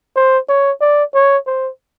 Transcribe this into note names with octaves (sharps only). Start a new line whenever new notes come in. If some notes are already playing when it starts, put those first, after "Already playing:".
C5
C#5
D5
C#5
C5